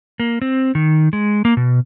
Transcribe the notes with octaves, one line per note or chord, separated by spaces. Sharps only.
A#3
C4
D#3
G#3
A#3
B2